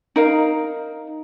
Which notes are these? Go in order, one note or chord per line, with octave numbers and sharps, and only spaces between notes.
D#4 A#4 F5